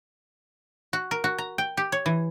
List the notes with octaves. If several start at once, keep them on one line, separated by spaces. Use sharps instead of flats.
F#4
A#4
F#4
A#5
G5
G4
C#5
E3